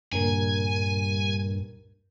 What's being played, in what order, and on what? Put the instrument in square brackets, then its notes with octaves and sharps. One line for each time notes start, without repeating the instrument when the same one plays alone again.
[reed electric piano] C#2 A#2 A#4 [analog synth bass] G2 [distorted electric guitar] G#5